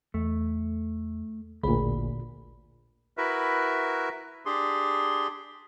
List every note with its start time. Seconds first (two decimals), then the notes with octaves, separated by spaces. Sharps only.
0.14 E2 A3
1.63 A1 D2 A#2 G#4 B5
3.17 E4 F#4 A#4 B4 E5
4.46 D4 G4 G#4 C6